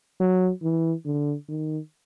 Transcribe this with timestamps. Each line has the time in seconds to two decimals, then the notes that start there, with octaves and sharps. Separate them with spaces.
0.20 F#3
0.63 E3
1.05 D3
1.49 D#3